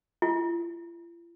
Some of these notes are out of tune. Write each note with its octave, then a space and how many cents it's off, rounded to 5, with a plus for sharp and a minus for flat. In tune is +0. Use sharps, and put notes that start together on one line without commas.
F4 -45